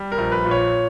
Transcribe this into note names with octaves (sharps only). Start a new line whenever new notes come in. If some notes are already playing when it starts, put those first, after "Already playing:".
Already playing: G3
A#4
A#1
B4
A#2
C#5